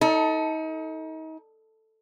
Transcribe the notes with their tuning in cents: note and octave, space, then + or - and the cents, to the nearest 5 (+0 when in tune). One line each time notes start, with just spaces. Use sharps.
D#4 +35 A4 +0